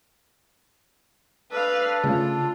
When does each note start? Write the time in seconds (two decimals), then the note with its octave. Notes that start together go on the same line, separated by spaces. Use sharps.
1.51 D4 A4 B4 F5
2.04 C#3 A3 F4